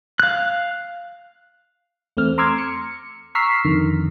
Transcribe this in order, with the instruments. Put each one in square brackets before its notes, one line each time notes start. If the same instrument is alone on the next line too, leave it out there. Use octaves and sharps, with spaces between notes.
[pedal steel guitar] F5 F#6
[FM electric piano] E2 A3 C4 F6
A#5 C6 D6 E6 F6 G#6
C#7
A#5 C#6 E6 F6 B6 C7
F2 D3 D#3